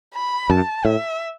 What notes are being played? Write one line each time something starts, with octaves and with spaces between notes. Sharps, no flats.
B5
F#2 A5
A2 E5